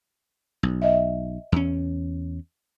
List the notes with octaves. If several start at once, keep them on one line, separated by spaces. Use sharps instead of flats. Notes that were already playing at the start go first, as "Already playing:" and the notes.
B1
D#5 E5
E2 C#4